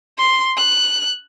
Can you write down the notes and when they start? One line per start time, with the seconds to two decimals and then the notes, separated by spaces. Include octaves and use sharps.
0.18 C6
0.57 F#6